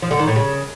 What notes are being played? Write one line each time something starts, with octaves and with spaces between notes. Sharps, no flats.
F3
D3
D#3
A2
C#3